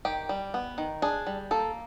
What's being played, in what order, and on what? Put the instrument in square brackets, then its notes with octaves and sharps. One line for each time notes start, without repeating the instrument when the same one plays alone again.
[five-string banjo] D#3 G4
G3
B3
D#3
D4 G#4
G3
A#3 A4